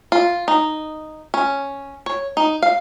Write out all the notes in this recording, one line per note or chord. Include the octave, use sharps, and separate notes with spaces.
F4
D#4
C#4
C#5
D#4
F5